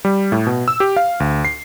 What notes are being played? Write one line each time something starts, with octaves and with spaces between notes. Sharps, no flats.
G3
A2
B2
E6
G4
F5
D2
C7